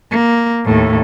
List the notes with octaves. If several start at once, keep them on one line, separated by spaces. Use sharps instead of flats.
A#3
D#2 A2